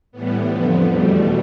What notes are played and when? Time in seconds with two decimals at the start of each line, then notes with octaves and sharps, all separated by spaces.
0.12 A2 E3 G3 B3
0.48 F2 D3 F3 B3
0.84 E2 B2 G3 A3